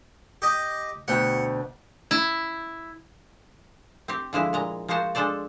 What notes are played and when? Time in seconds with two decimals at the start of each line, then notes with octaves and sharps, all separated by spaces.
0.42 G4 D#5
1.08 D2 B2 F#5 G5
2.11 E4
4.08 C4 G4
4.33 D3 F3 G#3 E4
4.53 A#2 G#3 A#5
4.88 F3 G#3 A#3 F#4 C5 A5
5.15 G#3 D4 A4 C5 D5